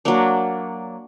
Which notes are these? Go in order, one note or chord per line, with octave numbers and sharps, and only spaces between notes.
F#3 A#3 D4